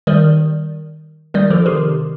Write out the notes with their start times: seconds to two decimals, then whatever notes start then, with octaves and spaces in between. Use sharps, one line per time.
0.07 D#3 G3
1.34 D#3 G3
1.50 D3 F3
1.66 C3 D#3